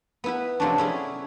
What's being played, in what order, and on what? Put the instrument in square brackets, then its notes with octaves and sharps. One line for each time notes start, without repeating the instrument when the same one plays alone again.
[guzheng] B3 E4 B4
C3 F3 F#3 A3 C#4 D4
C#4 E4 G#4